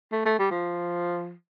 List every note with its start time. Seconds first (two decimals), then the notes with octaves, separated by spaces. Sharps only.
0.12 A3
0.25 A3
0.39 G3
0.51 F3